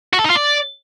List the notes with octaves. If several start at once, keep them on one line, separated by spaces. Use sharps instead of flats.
F#4
A4
D#4
F4
D5